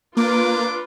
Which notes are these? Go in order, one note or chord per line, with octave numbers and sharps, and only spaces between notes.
A#3 D4 F4 B4 D6